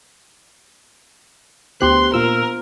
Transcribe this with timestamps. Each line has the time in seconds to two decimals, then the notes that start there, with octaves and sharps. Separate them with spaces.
1.81 D2 B3 D4 G4 C5 C6 F#6
2.14 A#2 F4 A#4 E6